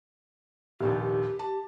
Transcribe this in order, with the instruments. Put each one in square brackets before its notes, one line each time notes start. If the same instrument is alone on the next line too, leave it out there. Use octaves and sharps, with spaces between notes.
[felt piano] F1 A#1 D#2 [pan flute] G4
[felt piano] A5